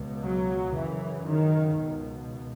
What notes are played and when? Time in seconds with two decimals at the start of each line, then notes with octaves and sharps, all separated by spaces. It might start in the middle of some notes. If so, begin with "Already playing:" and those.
Already playing: C#2 B2
0.21 F#3
0.73 F#2 C#3 E3
1.25 D#3
1.77 C#2 B2